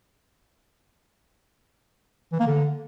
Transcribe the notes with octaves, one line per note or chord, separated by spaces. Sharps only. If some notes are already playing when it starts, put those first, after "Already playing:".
E3
A#3
D3